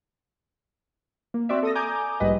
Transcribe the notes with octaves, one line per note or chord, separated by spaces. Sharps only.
A#3
C4 F#4 D5 E5
A4 D#6 A#6
G#5 A#5 D6 D#6 G6
A#1 G#2 G3 B4 D#5